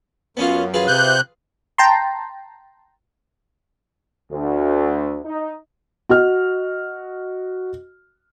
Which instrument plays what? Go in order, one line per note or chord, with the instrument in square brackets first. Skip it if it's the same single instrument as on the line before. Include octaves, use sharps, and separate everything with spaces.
[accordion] F#2 [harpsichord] B3 C#4 F4
[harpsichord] F4 G#4 B4
[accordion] C3 F#6 G6
[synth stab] G5 A5 A#5 C6
[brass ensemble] D2
D#4
[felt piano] F#4 D#5 F6